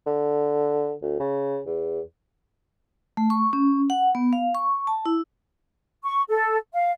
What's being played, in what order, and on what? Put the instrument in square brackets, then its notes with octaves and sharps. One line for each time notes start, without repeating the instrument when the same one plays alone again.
[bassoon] D3
D2
C#3
E2
[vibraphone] A3
C#6
C#4
F#5
B3
F5
C#6
A5
E4
[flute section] C#6
A4
F5